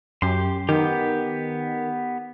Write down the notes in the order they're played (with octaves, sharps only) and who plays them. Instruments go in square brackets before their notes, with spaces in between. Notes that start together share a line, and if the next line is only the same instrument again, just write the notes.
[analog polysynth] F#2 [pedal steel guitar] G4 C6
[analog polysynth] D#3 [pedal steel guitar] B3 G4